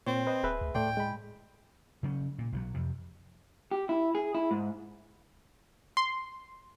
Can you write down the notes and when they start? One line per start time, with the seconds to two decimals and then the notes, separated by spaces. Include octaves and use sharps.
0.07 A#2 C4 C#5
0.27 B4 C5 D#5
0.43 D1 G#4 B4 E5
0.61 D2
0.75 A2 A3 D5 G5 C6
0.97 G#3 B5
2.03 C#3 F#3 C#4
2.38 A#2
2.52 B1 F3 F#3
2.74 F2 C3
3.71 G4
3.89 E4
4.15 G#4
4.35 E4
4.51 G#2
5.97 C6